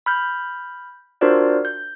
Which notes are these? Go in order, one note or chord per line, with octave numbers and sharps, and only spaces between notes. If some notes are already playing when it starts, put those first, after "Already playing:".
B5 F6 G6
D4 F4 F#4 A#4 C5 D5
G6